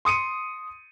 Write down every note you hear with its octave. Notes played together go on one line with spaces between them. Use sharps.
C6 D#6 C#7 D#7